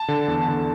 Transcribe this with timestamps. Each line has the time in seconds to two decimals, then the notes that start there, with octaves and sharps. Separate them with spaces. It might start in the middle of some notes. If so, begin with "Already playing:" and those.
Already playing: A5
0.08 D3
0.28 E2
0.48 D3